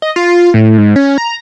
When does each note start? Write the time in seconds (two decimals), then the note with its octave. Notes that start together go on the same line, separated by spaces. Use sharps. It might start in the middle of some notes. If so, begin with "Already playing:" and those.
0.02 D#5
0.16 F4
0.54 A2
0.78 G#2
0.96 C#4
1.18 A#5